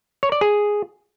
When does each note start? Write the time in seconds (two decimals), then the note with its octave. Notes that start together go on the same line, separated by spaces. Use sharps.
0.23 C#5
0.32 D5
0.41 G#4